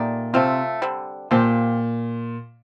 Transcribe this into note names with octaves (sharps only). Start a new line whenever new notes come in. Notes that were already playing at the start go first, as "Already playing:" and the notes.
Already playing: A#2 A3 D#4 G4 D5
C3 A3 C4 F4
D3 G3 C4
A#2 F3 C4 G4